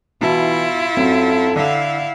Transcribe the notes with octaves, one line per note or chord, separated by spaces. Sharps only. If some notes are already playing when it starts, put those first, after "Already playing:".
B2 E3 E4 F4 A5
F#2 C4 A4
D3 E4 F5 F#5